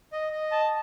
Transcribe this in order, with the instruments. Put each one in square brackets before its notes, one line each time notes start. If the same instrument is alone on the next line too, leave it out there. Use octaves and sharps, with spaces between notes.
[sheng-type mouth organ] D#5
D#5
A5